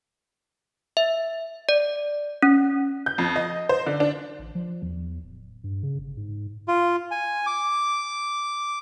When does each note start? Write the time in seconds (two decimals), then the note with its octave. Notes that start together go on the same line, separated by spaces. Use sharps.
0.97 E5
1.69 D5
2.43 C#4
3.06 G6
3.18 F2
3.36 D#5
3.69 C5
3.86 D3
4.00 D4
4.39 A1
4.55 F3
4.82 E2
5.23 D1
5.64 G2
5.83 C#3
5.99 G1
6.17 G#2
6.68 F4
7.11 G#5
7.46 D6